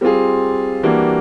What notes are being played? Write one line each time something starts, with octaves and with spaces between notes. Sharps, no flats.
G3 C4 F4 G#4
E3 G3 A#3 D4 F#4